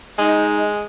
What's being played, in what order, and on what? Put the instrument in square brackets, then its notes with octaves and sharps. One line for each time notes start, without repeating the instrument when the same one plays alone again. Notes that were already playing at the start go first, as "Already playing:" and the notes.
[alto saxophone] G#3 [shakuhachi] D#4